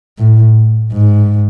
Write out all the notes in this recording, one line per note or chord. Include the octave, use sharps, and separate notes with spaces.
A2
G#2